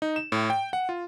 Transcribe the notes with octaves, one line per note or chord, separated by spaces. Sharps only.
D#4
E7
A2
G5
F#5
F4